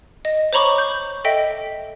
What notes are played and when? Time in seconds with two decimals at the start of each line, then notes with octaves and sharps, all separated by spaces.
0.25 D#5
0.53 C5 C#5 A#5 B5 C#6 D6
0.78 G6
1.25 A4 D#5 E5 G5